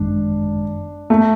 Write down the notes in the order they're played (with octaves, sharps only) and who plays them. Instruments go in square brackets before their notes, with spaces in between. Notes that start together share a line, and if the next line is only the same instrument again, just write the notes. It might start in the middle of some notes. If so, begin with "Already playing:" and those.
Already playing: [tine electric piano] G#1 F#2 D#3 G#3 [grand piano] D4
[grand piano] A3